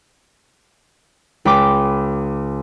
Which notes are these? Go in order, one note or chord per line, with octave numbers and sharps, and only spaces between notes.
C#2 G5 B5 D6